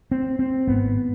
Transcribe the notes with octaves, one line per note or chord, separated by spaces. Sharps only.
C4
C4
G#1 G#2 B3